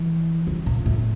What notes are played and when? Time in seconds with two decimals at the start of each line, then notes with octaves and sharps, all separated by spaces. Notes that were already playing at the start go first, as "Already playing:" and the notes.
Already playing: E3
0.47 D3
0.66 A#2
0.86 A2